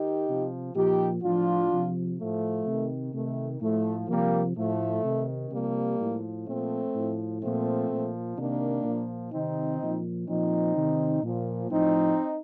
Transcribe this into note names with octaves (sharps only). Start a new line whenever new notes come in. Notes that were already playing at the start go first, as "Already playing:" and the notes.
Already playing: D#3 D#4 G4
C3 F3
A#2 F3 D#4 G4
A2 F3 D4 F4
C3 F3
A2 F3 A3
C3 D#3
C3 D#3 A3
A2 F3 A3
C3 F3 G3 A#3
A2 F3 A3
C3 D#3
C3 F3 G3 A#3
A2 F3
A#2 F3 A3 C4
A2 F3
A#2 F3 A3 C4
A#2 F3
C3 D#3 A#3 D4
A#2 F3
C3 D#3 C4 D#4
A#2 F3
A#2 F3 C4 D#4
C3 D#3
A#2 F3
A2 F3 C4 D#4